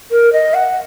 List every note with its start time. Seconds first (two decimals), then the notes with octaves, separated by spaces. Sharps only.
0.11 A#4
0.32 D#5
0.54 F#5